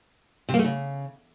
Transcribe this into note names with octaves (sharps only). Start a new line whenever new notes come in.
C3
A#3
A3
C#3